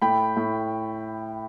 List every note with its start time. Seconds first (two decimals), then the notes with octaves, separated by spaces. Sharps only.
0.02 A2 G5 B5
0.36 A2